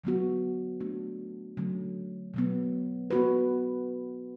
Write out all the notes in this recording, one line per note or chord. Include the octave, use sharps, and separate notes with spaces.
D3 F#3 B3 F#4
A3 D4 F#4
D3 F#3 A3 C#4
B2 F#3 B3
B3 F#4 B4